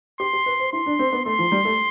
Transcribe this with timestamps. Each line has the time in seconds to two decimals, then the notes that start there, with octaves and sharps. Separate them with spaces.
0.20 G4 C6
0.33 G4
0.46 B4
0.60 C5
0.72 E4 C6
0.86 D4
0.99 C4
1.12 B3
1.25 A3 C6
1.39 F3
1.52 G3
1.65 A3